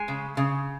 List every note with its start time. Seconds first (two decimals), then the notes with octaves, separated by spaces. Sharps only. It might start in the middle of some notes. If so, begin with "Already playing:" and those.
Already playing: G#3 G#5
0.08 C#3
0.37 C#3